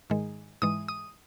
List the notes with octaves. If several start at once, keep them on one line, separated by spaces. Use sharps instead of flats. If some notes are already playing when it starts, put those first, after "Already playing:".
G#2 D#3 G#3
G#2 E3 G#3 D#6
D#6